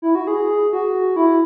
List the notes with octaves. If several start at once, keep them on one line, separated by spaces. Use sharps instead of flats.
E4
F#4
G#4
F#4
E4